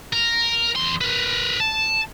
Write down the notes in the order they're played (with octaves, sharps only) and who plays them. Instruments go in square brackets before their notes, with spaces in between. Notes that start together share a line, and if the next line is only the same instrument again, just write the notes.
[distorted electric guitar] A#4
E2 C6
A#4 B4
A5